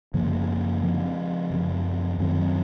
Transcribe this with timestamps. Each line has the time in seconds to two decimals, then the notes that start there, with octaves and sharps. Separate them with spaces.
0.14 F#2 C#3 F3 A#3
0.82 C#3 F3 C4
1.50 F#2 C#3 F3
2.19 F#2 D#3 F#3 C4